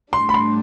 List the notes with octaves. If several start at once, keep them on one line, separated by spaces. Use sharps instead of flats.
A2 G3 D4 C6
B5
C6